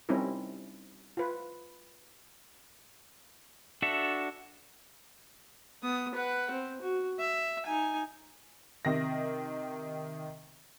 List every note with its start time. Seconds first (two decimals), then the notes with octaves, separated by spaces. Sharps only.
0.09 G3 C4 C#4 D#4 E4 A#4
1.17 F4 B4
3.82 D4 F#4 A4 E5
5.83 B3 D#6
6.14 B4 F#5
6.51 C4
6.81 F#4
7.20 E5
7.66 D#4 G#5
8.85 C3 D#3 A#6